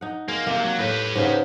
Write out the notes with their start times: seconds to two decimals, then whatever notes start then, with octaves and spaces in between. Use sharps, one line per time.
0.01 D#4 F#5
0.28 G#3 A#3
0.47 C3 A#3
0.63 F#3
0.79 A2 G4 B4
1.15 G#2 C#3 B3